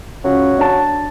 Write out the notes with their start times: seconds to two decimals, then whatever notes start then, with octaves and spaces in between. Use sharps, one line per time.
0.24 C#2 F#3
0.58 D4 A5